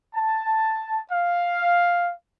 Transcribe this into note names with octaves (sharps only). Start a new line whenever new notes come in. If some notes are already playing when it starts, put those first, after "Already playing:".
A5
F5